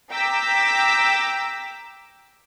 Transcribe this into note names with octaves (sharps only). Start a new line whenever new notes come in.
G5 A#5 D6 E6 B6